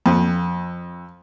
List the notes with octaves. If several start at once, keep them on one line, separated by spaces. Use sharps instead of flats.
F2